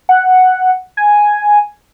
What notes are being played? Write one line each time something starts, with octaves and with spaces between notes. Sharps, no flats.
F#5
G#5